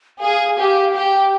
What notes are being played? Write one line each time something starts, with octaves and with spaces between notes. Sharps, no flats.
G#4 F5
G4
G4 G5